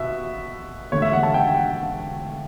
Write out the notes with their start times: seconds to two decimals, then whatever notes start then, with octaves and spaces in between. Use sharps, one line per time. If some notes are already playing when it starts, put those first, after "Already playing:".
Already playing: B2 E5
0.92 E1 D2 D3 A3 C#5
1.02 E5
1.13 F#5
1.23 A5
1.34 G5
1.56 F#5